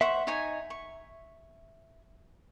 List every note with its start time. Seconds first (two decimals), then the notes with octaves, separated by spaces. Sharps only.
0.01 C5 E5 F#5 C#6
0.27 D#4 C#5 G#5
0.70 C#6